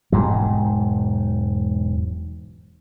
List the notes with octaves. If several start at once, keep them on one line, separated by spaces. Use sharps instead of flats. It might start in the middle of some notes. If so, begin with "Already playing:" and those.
E1 G#2 F#3